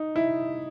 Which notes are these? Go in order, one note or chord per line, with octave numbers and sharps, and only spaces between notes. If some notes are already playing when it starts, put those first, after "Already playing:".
Already playing: D#4
E4